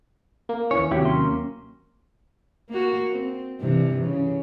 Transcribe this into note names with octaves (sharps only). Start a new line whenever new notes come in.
A#3
D#2 E3 C#4 C#5
D#2 C3 F#3 E4 G4
A#3 C#4 C6
A#3 F#4
C4
G2 C3 E3
C#3